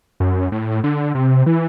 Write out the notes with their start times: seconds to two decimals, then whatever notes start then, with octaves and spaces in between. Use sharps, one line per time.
0.20 F#2
0.52 A2
0.84 D3
1.15 C3
1.46 E3